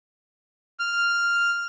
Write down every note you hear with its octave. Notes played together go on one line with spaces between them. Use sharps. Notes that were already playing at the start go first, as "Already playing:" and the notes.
F6